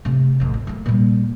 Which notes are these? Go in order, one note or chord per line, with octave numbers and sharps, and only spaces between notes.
C3 A3
A1 F2
C4
A3 A#3
A#2 G3